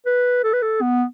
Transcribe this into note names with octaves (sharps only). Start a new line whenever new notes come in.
B4
A4
B4
A4
B3